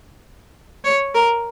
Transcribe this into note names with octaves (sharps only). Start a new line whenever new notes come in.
C#5
A#4